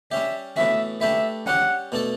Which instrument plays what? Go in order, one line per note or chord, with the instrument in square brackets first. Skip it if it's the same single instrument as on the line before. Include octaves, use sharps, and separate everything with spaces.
[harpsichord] G3 C#4 G4 [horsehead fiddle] E5
[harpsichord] A2 E3 B3 F#4 [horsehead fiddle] E5
[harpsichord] A3 D4 G4 B4 [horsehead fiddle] E5
[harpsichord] G3 C#4 G4 [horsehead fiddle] F#5
[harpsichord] B2 A3 D4 A4